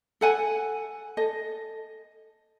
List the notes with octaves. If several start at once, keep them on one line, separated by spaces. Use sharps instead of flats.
A4 F#5 G#5
A4 D#5